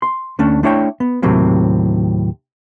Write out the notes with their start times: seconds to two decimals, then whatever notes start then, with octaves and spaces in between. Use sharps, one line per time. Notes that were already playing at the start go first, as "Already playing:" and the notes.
0.02 C6
0.39 D2 A3 C#4 D4
0.63 A3 D4 E4 C#5 F#5 G5
1.00 B3
1.22 D#2 A2 C3 F#3 A#3 C4